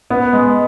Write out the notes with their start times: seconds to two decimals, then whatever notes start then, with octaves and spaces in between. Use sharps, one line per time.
0.10 B3
0.33 G#3